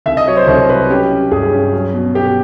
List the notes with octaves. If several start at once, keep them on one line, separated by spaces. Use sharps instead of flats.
C2 E5
D#5
F#3 C#5
C5
C2 C5
F#3 B4
C#4 G4
C#4
G2 G#4
C#4
F#3
B2
B3 G4